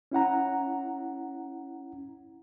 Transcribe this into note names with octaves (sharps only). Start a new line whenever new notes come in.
C#4 E4 F#5 A#5